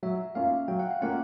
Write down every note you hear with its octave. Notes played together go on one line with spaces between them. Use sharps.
F#3 E5
A#3 C#4 F4 F5
F#3 G5
F#5
F5
A#3 C#4 F4 F#5